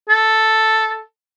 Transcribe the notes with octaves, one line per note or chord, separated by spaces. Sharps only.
A4